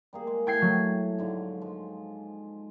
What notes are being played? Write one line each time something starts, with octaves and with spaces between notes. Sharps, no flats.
G3 A#3 G#4
G#3
A2 A3 F#5 G5 G#6 C7
F#3
G#2 D3 F3
F3 G#3